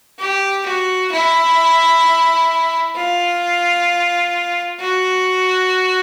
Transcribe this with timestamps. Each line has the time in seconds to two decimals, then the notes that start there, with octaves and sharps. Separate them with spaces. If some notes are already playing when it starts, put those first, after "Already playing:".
0.19 G4
0.65 F#4
1.11 E4
2.96 F4
4.80 F#4